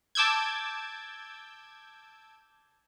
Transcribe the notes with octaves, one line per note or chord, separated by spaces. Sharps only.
A5 D6 E6 G6 G#6